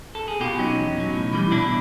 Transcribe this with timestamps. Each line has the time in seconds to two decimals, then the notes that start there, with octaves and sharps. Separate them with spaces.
0.15 A4
0.28 G#4
0.40 B2 F4 G4
0.59 F#3 C#4 D#4
0.78 E2
0.96 B2 F#3
1.14 A2
1.33 E3 G3
1.51 B2 D4 E4